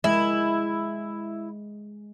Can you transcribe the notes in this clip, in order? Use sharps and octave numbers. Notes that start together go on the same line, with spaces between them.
G#3 E4